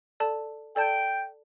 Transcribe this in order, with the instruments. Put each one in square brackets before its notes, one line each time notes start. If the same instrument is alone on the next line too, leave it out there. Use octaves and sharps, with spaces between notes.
[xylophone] A4 D5 A5
[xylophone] A4 D5 A5 [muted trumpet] G5